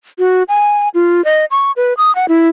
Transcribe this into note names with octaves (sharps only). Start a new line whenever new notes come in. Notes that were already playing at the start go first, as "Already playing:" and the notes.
F#4
G#5
F4
D#5
C#6
B4
D#6
F#5
E4